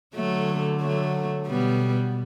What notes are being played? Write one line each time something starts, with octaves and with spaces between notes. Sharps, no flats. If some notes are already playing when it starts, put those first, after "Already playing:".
D3 F#3 A3
F#3 A3
B2 G3 B3